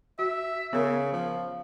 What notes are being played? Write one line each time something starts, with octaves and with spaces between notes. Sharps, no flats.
F#4 E5
C#3 B3 A#4
F3